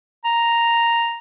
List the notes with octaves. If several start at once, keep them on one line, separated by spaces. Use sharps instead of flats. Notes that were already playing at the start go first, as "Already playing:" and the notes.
A#5